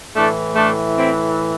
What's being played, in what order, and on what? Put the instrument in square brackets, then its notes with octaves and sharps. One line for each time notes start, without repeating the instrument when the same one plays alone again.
[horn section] A2 E3 A3 D4
A3 D4
C4 E4